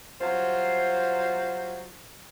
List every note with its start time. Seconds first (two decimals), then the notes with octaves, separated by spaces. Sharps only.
0.21 F#3 G3 F4 C5